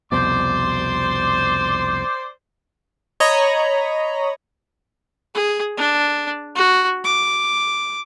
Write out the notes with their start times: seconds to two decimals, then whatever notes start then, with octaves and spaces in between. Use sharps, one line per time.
0.12 C2 F2 B2 C5 D5 C6
3.20 C#5 D#5 A#5 B5
5.35 G#4
5.77 D4
6.55 F#4
7.04 D6